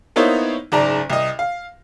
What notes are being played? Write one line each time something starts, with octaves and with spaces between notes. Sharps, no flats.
A#3 B3 D#4 E4 C5 C#5
F#1 G#2 D5 A5 A#5
C2 D#5
F5